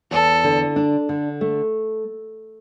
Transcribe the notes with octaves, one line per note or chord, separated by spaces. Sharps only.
E2 A4
D3
D4
D3
A3